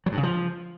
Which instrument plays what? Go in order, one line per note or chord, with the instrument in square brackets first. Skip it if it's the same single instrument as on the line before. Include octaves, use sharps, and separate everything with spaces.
[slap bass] F#3
G2
C#3
F3